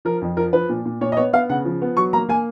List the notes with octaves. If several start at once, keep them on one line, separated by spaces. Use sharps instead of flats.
F3 A#4
F2
F3 A#4
F3 B4
A#2
A#2
A#2 C#5
D#5
B3 C#5
B3 F5
C#3 F#5
F3
B3
F#3 C#6
A#3 A#5
A#3 G#5